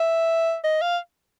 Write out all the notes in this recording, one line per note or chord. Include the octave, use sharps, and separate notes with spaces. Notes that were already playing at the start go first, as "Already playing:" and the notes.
Already playing: E5
D#5
F5